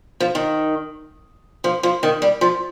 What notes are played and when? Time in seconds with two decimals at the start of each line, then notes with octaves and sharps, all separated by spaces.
0.20 F3
0.35 D#3
1.64 F3
1.83 F3
2.03 D#3
2.22 G3
2.41 F3